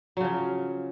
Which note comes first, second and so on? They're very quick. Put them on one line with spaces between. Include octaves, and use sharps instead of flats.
F#3 C#3 F3